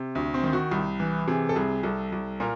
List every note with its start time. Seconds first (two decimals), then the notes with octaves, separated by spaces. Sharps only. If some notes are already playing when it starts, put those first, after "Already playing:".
Already playing: C3
0.15 D2
0.34 C4
0.44 D#3
0.53 F#4
0.71 C2
1.00 E3
1.28 C3 G#4
1.49 A4
1.56 C2 G#4
1.83 C2 A4
2.12 C2
2.40 A#2 A#4